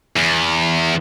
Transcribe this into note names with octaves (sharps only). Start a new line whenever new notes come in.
E2